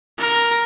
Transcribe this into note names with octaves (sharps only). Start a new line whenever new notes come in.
A#4